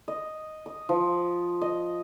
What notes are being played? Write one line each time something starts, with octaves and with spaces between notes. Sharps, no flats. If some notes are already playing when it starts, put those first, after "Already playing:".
D#5
D#6
F3
D#5